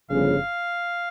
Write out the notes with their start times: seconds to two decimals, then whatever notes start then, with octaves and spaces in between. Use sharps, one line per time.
0.10 G1 F2 C#3 F5